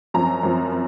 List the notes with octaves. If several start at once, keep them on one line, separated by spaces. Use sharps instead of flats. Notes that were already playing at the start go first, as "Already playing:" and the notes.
F#2 F3 C4 A#5
F#2 F3 C4
C4